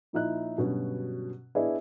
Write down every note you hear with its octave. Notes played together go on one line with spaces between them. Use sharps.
A#2 F3 D#4 E4 F#6
G2 B2 D3 F#3 C#4
B3 D4 E4 G#4 D5 D#5